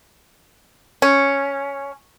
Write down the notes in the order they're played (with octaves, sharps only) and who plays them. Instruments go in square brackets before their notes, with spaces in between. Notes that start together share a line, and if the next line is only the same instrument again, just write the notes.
[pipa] C#4